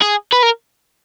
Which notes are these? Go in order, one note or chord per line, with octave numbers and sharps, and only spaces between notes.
G#4
B4
A#4